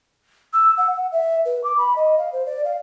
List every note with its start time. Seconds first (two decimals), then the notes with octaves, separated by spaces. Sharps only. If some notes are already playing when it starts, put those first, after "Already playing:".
0.53 E6
0.78 F#5
0.94 F#5
1.12 E5
1.45 B4
1.64 D6
1.78 B5
1.96 D#5
2.18 F5
2.33 C5
2.46 D5
2.65 F5